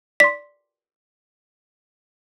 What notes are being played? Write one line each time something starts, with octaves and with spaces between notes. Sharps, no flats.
D5 C6 B6